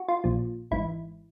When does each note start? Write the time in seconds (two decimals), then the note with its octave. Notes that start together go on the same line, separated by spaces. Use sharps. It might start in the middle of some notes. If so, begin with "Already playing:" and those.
Already playing: F#4
0.08 F4
0.24 A#1 A#2 F3
0.71 G#1 G#2 E3 E4